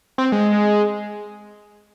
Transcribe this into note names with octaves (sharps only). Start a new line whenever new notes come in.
C4
G#3